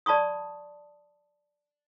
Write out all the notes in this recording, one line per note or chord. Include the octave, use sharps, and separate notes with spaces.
D5 A5 B5 C#6 D#6